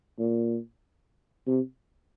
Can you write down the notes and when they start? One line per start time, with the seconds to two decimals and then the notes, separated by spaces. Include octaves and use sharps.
0.19 A#2
1.47 C3